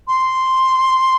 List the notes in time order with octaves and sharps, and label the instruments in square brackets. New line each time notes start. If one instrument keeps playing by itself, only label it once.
[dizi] C6